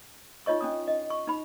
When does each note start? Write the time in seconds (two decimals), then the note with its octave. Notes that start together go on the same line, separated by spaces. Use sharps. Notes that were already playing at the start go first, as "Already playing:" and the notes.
0.46 D#4 F4 C#5 D#5 C#6
0.61 C#4 D4 D#6
0.87 D#5
1.10 C#6
1.27 D#4 B5